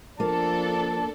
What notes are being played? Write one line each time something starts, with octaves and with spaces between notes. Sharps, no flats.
F3 A#3 D4 A4 A5